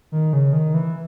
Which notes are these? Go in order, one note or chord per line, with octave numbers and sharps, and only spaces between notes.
D#3
C#3
D#3
E3